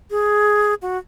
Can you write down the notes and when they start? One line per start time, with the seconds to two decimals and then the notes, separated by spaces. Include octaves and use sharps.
0.10 G#4
0.82 F#4